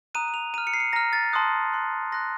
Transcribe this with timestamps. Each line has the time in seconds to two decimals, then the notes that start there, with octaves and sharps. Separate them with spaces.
0.14 A#5 D#6 F#6 D#7
0.28 D#7
0.34 F7
0.54 A#5 F6 D#7
0.67 C#7
0.74 C7
0.80 C#7
0.93 A#5 F6 A#6
1.13 A6
1.33 A5 C6 D#6 F#6
1.73 C6 F#6
2.12 C6 F#6 A#6